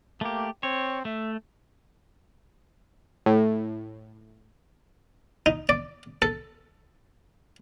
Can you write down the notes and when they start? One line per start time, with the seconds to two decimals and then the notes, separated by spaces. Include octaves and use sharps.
0.21 A3 A#3 G4
0.63 C4 C#5
1.05 A3 E5
3.26 A2
5.46 D#4
5.69 D5
6.22 A4